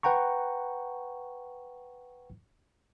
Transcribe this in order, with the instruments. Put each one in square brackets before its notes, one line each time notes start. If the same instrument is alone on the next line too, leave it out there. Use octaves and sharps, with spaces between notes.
[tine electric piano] B4 F#5 G5 A#5 C#6